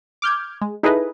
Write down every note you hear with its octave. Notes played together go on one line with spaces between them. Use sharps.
D6 F6 G6 G#6
G#3
D#4 E4 G#4 A4 B4 D#5